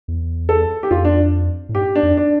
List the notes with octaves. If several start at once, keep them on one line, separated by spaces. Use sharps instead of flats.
E2
A4
G4
F2 F4
D4
A2
G2 G4
D4
F2
D4